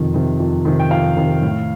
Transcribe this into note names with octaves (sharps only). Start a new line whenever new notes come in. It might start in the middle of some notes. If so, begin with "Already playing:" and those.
Already playing: F2 C3 D#3
C3 D#3
F2
C3 D#3
G5
F2 F5
C3 D#3
A2